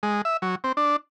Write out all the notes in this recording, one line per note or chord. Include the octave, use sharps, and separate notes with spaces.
G#3
E5
F#3
C4
D4